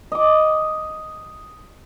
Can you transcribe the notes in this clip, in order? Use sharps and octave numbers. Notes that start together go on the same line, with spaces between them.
D#5 D6